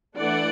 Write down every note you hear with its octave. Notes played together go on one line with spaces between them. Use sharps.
E3 A3 D4 D5 F#5